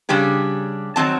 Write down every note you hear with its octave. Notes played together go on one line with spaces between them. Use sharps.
C#3 G3 D4 G4 G#4
D#3 F#3 C4 A5